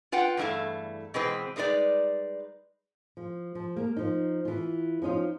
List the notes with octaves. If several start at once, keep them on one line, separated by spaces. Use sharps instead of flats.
F4 B4 F#5 G5
E2 G2 A3 E4 F5
B2 E3 G#3 C4 B4
G3 G#3 D#4 B4 D5
F3
F3
A#3 A#4
F3 D#4
E3 F4
F3 C#4 D#4 F4